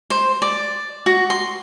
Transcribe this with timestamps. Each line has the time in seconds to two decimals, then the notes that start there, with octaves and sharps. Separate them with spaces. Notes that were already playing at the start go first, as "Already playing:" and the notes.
0.10 C5
0.42 D5
1.06 F#4
1.30 C6